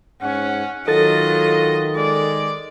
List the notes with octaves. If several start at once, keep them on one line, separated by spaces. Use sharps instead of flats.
G#2 C#4 F#5
D#3 F#3 F4 A4 D#5 A6
G#3 D5